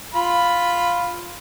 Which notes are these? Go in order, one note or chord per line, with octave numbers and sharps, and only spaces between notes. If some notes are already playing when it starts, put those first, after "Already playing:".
F4 B5